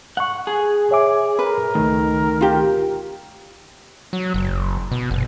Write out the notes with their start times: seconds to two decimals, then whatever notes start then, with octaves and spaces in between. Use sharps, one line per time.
0.17 F#5 C#6 F#6
0.47 G#4
0.91 C#5 E5 D6
1.39 A#4 B4
1.75 C#2 D#3 A3
2.41 F4 G4
4.13 F#3
4.34 F#1
4.91 B2
5.11 F#1